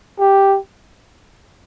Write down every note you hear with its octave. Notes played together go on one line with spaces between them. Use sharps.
G4